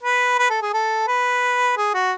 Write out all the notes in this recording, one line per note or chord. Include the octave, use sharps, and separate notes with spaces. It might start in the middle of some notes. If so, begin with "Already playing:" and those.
B4
B4
A4
G#4
A4
B4
G#4
F#4